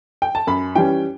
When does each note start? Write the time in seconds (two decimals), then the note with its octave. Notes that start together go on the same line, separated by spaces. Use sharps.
0.22 G5
0.35 A5
0.47 F#2 B5
0.75 E3 G3 C#4 G5